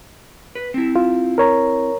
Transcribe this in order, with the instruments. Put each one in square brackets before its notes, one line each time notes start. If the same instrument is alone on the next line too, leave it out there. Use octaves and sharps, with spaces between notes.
[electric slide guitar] B4
C4 E4
[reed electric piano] F4
A#4 C#5 A#5